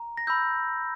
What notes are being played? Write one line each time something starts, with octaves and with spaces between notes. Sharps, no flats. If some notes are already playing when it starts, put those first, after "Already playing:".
Already playing: A#5
A#6
B5 E6 G6